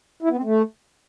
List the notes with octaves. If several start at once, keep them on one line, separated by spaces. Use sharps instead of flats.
E4
B3
C4
A3